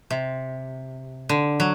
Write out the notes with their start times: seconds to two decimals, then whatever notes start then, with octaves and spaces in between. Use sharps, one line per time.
0.10 C3
1.29 D3
1.60 F#3